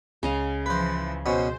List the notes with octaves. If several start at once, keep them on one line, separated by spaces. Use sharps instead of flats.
C#2 C#3 D#5 F5
E3 F3 B4 C5
B2 B3 C#4 C5